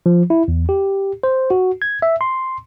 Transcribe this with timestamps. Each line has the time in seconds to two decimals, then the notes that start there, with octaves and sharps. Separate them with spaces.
0.06 F3
0.30 E4
0.48 E2
0.69 G4
1.23 C5
1.51 F#4
1.82 G#6
2.02 E5
2.21 C6